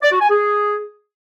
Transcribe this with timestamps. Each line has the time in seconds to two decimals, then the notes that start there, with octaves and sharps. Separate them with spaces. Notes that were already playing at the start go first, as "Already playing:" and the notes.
0.03 D5
0.12 F#4
0.21 G#5
0.30 G#4